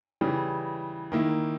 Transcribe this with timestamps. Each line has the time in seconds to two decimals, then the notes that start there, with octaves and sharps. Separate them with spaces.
0.21 C#3 E3 G3
1.12 D#3 A#3 E4